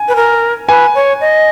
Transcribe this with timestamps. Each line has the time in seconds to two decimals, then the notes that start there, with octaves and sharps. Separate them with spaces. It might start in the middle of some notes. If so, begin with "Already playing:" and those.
Already playing: G#5
0.08 B4
0.16 A#4
0.68 B4 G#5
0.95 C#5
1.21 D#5